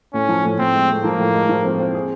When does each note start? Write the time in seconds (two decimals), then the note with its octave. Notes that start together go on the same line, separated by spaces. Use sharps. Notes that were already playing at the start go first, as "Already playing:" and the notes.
0.14 A2 C#4
0.29 F3
0.44 A2
0.59 A2 C4
0.74 G#3
0.90 A2
1.04 F3 A#3
1.19 A2
1.34 G#3
1.49 F3
1.65 C4
1.79 C4
1.94 G#4